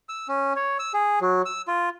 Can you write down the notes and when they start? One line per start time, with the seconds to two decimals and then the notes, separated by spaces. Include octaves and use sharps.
0.09 E6
0.28 C#4
0.56 C#5
0.79 E6
0.94 G#4
1.21 F#3
1.45 E6
1.68 F4